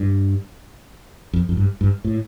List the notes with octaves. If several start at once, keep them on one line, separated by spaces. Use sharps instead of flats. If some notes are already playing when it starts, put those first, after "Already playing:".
Already playing: G2
F2
F2
G2
G2
A2